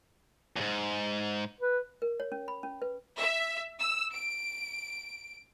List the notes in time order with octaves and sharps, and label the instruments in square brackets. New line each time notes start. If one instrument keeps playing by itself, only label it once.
[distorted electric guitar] E2 G#2
[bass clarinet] B4
[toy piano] A#4
C#5
C#4
B5
C#4
B4
[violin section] E5
E6
D7